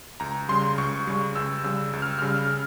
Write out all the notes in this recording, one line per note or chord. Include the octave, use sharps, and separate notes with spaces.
C#2 A#5
C#3 G3 C6
C#2 C#6
C#3 G3
C#2 E6
C#3 G3 E6
C#2
F6
E6
C#3 G3 F6